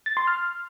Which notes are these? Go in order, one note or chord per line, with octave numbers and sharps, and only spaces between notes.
A6
C6
F6